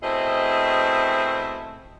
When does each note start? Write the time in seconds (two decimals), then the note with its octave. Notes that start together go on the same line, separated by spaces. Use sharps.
0.02 B2 A3 C4 E4 G#4 D#5